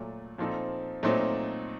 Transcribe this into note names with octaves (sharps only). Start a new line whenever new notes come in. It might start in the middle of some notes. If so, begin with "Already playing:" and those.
Already playing: A#2 F#3 A3
A#2 F3 C4 D#4 A4
A#2 F#3 A3 C4 D#4